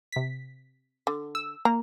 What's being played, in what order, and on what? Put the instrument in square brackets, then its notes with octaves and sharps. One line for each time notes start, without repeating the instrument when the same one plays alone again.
[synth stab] C3 B6
[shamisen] D3
[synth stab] E6
[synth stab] A#3 [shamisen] A#5